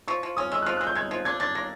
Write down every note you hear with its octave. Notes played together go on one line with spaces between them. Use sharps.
F3 C#6
F3
C#4 D#6
G#3 E6
F#6
F3 F6
F#6
G#3
G6
G#3 G#6
F3
D4 G#6
D4 A6
A#3 A#6